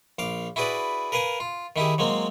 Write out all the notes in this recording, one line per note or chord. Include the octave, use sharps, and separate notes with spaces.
A#1 F5 D6
E4 F#4 G#4 B4 D5
A#4 B4 F5 G#5 A#5
F4
D#3 E4 G4 G#4
F#3 G#3 A#3 C4